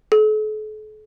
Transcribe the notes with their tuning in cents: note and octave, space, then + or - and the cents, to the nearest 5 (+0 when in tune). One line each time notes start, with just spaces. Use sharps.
A4 -45